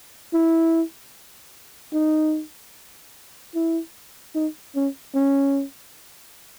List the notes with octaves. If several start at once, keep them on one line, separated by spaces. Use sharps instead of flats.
E4
D#4
E4
D#4
C#4
C#4